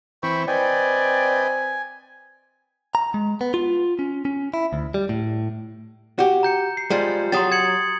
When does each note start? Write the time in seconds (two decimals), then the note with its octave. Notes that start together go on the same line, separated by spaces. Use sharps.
0.23 E3 C4 G5 B5 C#6
0.48 C4 B4 D5 D#5 G5 G#5
2.95 A#5
3.14 G#3
3.41 B3
3.54 F4
3.99 C#4
4.25 C#4
4.54 E4
4.73 D2
4.94 G3
5.09 A2
6.19 F#4 G4
6.43 A#5 G6 C#7
6.77 C7
6.90 F3 G3 G#3
7.32 F#3 G4 C6 D#6 A6
7.52 G#6 C#7 F#7